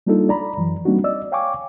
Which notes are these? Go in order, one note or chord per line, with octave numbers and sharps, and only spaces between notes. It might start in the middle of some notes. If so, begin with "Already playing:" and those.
G3 A#3 D4 D#4 F4 A4
D5 A#5 B5
F#2 E3 F#3
G3 A#3 C4 D4 D#4 F#4
D5 D#5 E6
C#5 F5 G5 G#5 C#6 D6